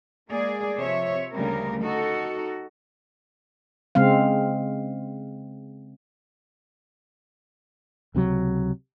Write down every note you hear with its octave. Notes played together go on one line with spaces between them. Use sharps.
G#3 A#3 G#4 D5
C3 F3 C#5 E5
D2 C#3 G3 A#3 A#4
D#4 F#4 A4
C#3 G#3 C4 F5
C#2 C3 E3 F#3